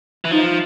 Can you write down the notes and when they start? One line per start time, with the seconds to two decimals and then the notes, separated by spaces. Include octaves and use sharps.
0.25 E3
0.31 F3 D#4